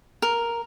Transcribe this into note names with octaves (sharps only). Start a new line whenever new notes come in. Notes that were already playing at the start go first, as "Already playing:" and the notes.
A#4